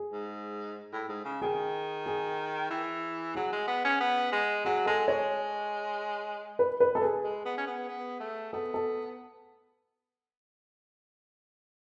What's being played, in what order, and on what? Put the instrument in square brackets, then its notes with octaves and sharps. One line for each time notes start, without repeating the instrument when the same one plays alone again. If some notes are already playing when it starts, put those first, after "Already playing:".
Already playing: [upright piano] G#4
[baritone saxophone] G#2
A2
G#2
C#3
[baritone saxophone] D#3 [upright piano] G#4
[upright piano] G#4
[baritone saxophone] E3
[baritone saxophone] F#3 [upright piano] G#4
[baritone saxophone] G#3
B3
C#4
B3
G#3
[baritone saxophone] F#3 [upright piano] G#4
[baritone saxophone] G#3 [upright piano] A4
[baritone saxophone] G#3 [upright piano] C#5
[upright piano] B4
B4
A4
G#4
[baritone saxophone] G#3
B3
C#4
B3
B3
A3
[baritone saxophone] B3 [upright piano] A4
[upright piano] A4